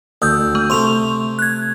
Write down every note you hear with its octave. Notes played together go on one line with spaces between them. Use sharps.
D2 D#6 E6 G6
A3
C3 A3 C6 C#6 F7
F#6 G#6